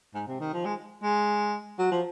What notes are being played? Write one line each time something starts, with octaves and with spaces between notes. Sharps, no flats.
G#2
C3
D#3
F3
G#3
G#3
F#3
F3